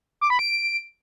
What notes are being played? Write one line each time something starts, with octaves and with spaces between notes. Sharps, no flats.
D6
B5
D7